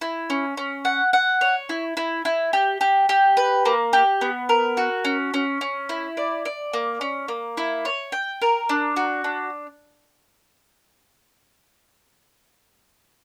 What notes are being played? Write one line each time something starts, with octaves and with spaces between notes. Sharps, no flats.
E4
C#4
C#4
F#5
F#5
C#5
E4
E4
E4
G4
G4
G4
B4
A#3
G4
B3
A#4
F#4
C#4
C#4
C#4
E4
D5
D5
A#3
C#4
A#3
E4
C#5
G5
A#4
D4
F#4
D4